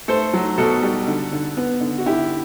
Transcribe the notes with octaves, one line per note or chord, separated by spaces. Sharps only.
A3 A4 C5
F#3
B2 F#4 A4
G3
D3
D3
B3
D3
F#4
D3 E4 G4